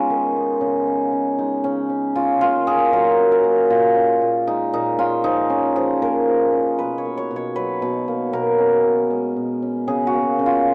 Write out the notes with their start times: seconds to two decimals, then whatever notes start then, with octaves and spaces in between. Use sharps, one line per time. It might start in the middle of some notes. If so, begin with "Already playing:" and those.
Already playing: G#3 B3 C#4 D#4 F4
0.10 D#3
0.36 B3
0.61 C#3
0.87 C#4
1.12 C#3
1.38 G#3 D#4
1.64 C#3 C#4
1.90 C#4
2.15 C#4 F4
2.41 A#3 F4
2.67 D#3 G#4
2.93 F#3 A#4
3.19 C#4
3.32 A#4
3.44 A#3
3.70 A#2 F4
3.96 C#4
4.22 A#2
4.47 G#3 D#4
4.73 A#2 D#4
4.99 C#4 F4
5.24 F3 D#4
5.50 C#4
5.76 F3 G#4
6.02 A#3 A#4
6.28 F3
6.53 C#4
6.78 B2 B4
6.98 C#5
7.05 A#3
7.18 C#5
7.31 B2
7.36 C#5
7.56 F#3 B4
7.82 B2
8.08 A#3
8.33 B2 A#4
8.58 C#4
8.84 B2
9.10 G#3
9.36 B2
9.62 C#4
9.88 C#3 G#4
10.07 F#4
10.13 A#3
10.39 C#3
10.46 F4